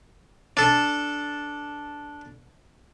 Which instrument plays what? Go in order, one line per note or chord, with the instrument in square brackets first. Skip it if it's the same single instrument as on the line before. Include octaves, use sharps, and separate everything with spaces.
[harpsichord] D4 A4